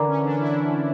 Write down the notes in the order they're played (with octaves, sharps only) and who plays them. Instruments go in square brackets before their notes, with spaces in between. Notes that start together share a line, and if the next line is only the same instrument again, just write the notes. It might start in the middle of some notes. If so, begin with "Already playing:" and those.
Already playing: [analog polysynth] D3 E3 [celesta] A#4 D5 A#5 D6
[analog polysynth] C#4
D4
E4